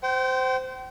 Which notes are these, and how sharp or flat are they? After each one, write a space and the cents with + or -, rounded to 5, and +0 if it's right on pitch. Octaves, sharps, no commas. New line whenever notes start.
C5 -15 G5 -40